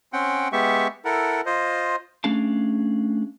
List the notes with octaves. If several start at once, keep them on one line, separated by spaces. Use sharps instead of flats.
C4 C#4 F#5 G5
G#3 B3 G4 E5 C#6
E4 A4 A#4 F#5
F4 C5 D#5
A3 C#4 D4 G#4 F5 A5